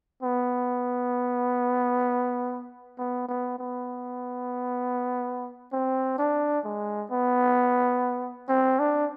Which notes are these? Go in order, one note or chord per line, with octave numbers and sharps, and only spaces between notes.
B3
B3
B3
B3
C4
D4
G#3
B3
C4
D4